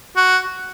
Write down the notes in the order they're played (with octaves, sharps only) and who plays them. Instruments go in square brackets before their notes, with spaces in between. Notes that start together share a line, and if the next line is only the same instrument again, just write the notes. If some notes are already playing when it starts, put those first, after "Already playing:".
[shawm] F#4